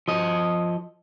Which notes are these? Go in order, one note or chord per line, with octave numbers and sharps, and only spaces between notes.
F3 D#5